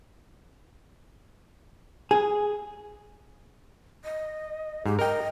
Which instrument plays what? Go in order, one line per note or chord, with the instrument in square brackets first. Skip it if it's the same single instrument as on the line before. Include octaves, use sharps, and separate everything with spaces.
[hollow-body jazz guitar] G#4
[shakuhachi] D#5
[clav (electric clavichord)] G#2 [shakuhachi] G4
[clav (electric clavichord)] A#4 G5 [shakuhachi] D#5